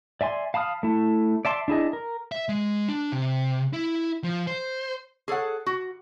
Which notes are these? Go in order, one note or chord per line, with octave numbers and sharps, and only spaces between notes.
D5 E5 G#5 C6
F5 A5 B5 D#6 F6
A3 E4
D5 E5 A5 C6
D4 E4 G#4 D#5
A#4
E5
G#3
D4
C3
E4
F3
C5
G#4 A4 C#5 F#5
F#4